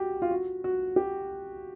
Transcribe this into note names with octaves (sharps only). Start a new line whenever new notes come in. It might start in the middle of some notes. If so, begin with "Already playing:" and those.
Already playing: F#4 G4
F4
F#4
F#4
G4